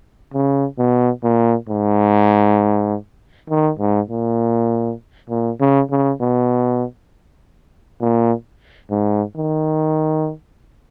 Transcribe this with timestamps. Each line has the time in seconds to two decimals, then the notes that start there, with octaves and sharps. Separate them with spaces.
0.34 C#3
0.78 B2
1.23 A#2
1.69 G#2
3.50 D#3
3.79 G#2
4.09 A#2
5.30 A#2
5.60 C#3
5.90 C#3
6.21 B2
8.01 A#2
8.90 G#2
9.36 D#3